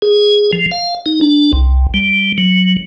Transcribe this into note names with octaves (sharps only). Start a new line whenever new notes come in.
G#4
F3
F5
D#4
D4
C2
G3
F#3